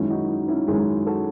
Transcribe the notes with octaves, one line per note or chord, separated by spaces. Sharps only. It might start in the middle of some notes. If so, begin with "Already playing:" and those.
Already playing: F#2 D#3 G#3 C#4 E4
D#4 F#4
D#4
C#4 E4
F#2 D#3 G#3 C#4 E4 G#4
F#4 A4